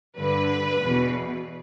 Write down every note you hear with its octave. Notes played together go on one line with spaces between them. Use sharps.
G2 D3 B4
E2 B2